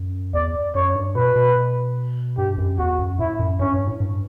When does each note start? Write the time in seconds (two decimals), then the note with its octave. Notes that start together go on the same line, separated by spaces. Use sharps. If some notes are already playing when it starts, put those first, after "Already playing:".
Already playing: F#2
0.34 E2 D5
0.75 F#2 C#5
0.95 G2
1.15 B2 B4
1.36 B2
2.37 G2 G4
2.58 F#2
2.78 E2 F#4
2.99 F#2
3.19 A2 E4
3.40 F#2
3.59 G2 C#4
3.74 G2
3.87 A2
4.00 G2